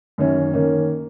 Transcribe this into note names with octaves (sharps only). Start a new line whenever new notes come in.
F#2 D#3 A#3 C#4
D#3 A#3 C#4